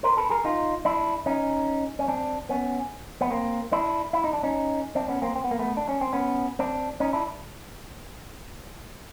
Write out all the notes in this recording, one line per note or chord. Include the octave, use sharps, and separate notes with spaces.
A#4 C5
A4 B4
G#4 A#4
D#4 F4
D4 E4
C#4 D#4
C#4
C4 D4
B3 C#4
B3
A#3 C4
D4 E4
E4
D#4
D4
C#4 D#4
C4 D4
B3 C#4
A#3 C4
C4
B3
A#3
A3 B3
D4
C#4
C4
B3 C#4
C4 D4
C#4 D#4
D4 E4